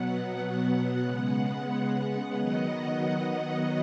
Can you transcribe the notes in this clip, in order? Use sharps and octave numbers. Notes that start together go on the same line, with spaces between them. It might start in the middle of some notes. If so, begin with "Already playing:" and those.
Already playing: B2 F#3 B3 F#5
C#3 G#3 B3
D#3 F#3 B3 D#5